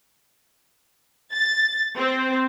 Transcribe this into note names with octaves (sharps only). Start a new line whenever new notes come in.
A6
C4